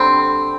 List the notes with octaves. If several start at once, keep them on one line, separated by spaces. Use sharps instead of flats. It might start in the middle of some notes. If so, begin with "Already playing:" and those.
Already playing: D3 G3 C4 G5